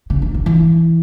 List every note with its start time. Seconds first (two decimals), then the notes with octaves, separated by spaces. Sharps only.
0.10 C#3
0.22 D#3
0.34 D#3
0.46 E3